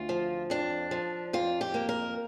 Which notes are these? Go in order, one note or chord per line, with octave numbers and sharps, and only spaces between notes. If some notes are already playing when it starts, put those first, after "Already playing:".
Already playing: D2 F4
F3
F2 D4
F3
F2 F4
G4
A#3
A#4